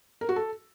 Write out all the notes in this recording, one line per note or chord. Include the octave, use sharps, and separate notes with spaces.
A#4
F#4
A4